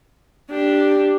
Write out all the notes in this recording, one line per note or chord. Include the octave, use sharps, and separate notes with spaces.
D4 G4